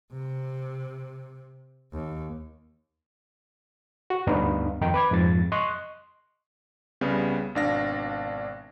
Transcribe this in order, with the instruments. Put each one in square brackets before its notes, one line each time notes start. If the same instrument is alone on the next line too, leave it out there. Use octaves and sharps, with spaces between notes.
[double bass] C3
D#2
[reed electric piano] F#4
D2 G2 B3 D4 D#4 F5
F2 D#3 D#4 G5
B4 D6 G#6
F2 G#2 F3 A6
D#5 C6 C#6 F#6
[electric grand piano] C2 C#3 G3 B3
G#1 B2 D4 F5 A#6